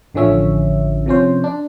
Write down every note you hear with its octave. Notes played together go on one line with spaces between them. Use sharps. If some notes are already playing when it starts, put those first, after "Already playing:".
A1 D3 F3 C#4 E5
C3 F3 C#4 C5
D4